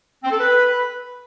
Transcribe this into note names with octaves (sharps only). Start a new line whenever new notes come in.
C4
A4
B4